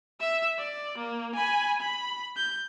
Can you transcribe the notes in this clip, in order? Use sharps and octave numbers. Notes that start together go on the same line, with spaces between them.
E5 E6
D5
A#3
G#5 B5
B5
G6